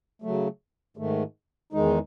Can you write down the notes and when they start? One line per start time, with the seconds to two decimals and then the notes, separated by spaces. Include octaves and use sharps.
0.22 C#3 F#3 A3
0.97 G#2 D#3 A3
1.73 E2 D#3 G#3 D#4